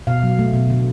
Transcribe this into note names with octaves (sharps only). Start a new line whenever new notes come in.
B2 F5
F#3
A3
B2
D3